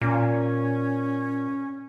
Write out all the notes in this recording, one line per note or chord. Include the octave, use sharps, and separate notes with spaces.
A#2 C#4